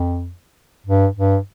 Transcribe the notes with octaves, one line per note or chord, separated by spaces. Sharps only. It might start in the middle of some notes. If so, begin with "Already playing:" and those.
Already playing: F2
G2
G2